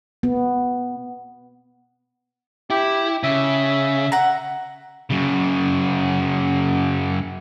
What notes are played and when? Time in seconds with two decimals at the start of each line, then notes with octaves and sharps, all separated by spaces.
0.23 B3
2.70 E4 G4
3.23 C#3 E5
4.12 F#5 A#5
5.10 F#2 C#3